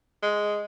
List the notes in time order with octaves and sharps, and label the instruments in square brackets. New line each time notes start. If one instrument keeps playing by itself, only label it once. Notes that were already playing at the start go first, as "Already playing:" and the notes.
[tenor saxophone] G#3